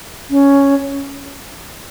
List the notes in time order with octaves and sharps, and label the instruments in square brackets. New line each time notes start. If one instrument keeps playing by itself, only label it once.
[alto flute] C#4